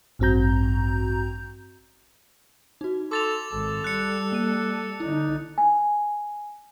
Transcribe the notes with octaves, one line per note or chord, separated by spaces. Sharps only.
A1 G2 C4 F#4 A#5 G6
D#4 F#4
A4 C6 D6 A6 F7
G#1 A4
G3 F#6 C#7
A#3 D#7
D3 D#4 E4
G#5